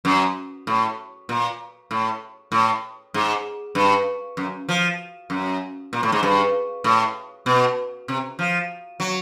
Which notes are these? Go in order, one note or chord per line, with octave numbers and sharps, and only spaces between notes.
F#2
A2
A#2
A2
A2
G#2
G2
F#2
F3
F#2
A#2
A2
G#2
G2
A2
B2
C3
F3
F#3